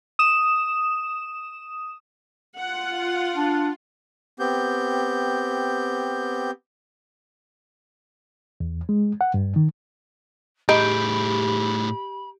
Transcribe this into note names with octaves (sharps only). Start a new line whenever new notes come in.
D#6 E7
F4 F#5
D4
B3 C4 G4 G6
E2
G#3
F#5
G2
D#3
A2 D#4 G4 G#4 B5